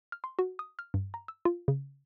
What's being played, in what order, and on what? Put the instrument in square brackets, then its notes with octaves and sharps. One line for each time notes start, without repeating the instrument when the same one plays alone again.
[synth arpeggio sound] F6
C6
F#4
D#6
F6
G2
A#5
E6
F4
C#3